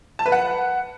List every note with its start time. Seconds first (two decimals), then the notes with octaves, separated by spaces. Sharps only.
0.19 A5
0.26 B4
0.32 F#5